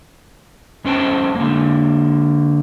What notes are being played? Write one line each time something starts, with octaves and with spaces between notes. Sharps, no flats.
F#2 C#4 C5 G5 A5
D3 A#3